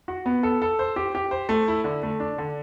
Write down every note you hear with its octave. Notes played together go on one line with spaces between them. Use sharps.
F#4
B3
A4
A4
C5
G4
G4
C5
A3
E4
D3
A3
D4
D3